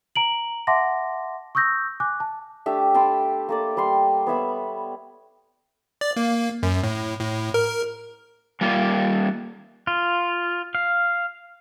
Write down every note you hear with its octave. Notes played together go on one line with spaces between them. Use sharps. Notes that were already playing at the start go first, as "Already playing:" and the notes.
A#5 D7 F#7
E5 F#5 A5 C6 D6 A#6
C#6 D#6 E6 G6 A#6
G#5 D6 F#6
A5
A3 D4 G4 E5
G5 A5 B5 C6
A#3 A4 D5
G3 C6
B3 C#5 E5 B5
D5
A#3
F#2
A2
A2
A#4
G3 A#3 F4
F4
F5